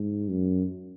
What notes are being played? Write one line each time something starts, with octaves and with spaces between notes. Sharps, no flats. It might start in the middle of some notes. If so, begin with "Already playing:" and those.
Already playing: G#2
F#2